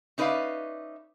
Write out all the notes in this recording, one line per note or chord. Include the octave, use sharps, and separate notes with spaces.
C#4 D#4 B4 D5 E5 F5